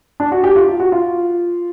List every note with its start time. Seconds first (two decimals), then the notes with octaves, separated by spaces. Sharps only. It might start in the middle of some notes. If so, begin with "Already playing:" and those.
0.20 D4
0.32 F#4
0.44 G4
0.56 F4
0.68 F4
0.80 F#4
0.92 F4